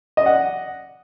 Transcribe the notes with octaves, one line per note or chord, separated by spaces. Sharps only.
D5 D#5 F#5